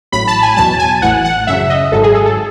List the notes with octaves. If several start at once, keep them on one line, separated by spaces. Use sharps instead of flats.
A1 A2 F#3 B5
A5
G#5
E2 B2 F#3 A5
G#5
A1 A2 E3 F#5
F#5
F#2 C#3 F#3 E5
D#5
G#1 G#2 F#3 A4
G#4
A4
A4